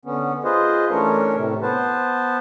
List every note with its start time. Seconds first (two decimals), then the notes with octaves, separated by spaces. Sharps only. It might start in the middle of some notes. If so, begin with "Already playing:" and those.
0.05 D3 B3 C#4
0.44 F4 G#4 B4 C5 D#5
0.91 E3 A3 C#4 D4 A#4 C#5
1.36 A2 C3 A3
1.62 B3 B4 C5 A5